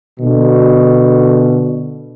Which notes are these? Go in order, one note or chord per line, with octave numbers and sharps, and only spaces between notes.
B2 D3